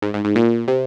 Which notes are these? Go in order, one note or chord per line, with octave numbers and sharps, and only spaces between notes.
G#2
G#2
G#2
A#2
C3